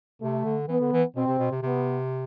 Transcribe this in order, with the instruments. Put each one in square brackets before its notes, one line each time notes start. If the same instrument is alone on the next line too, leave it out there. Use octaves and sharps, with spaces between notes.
[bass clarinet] C3 [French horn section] A3
[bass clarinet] D3
[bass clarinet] E3 [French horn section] B3
[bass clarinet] D3
E3
[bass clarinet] B2 [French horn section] C4
[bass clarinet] C3
B2
C3
[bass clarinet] C3 [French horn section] B3